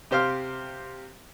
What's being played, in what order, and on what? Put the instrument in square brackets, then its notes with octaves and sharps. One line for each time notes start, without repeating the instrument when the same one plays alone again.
[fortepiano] C3 G4 C5 F5 F6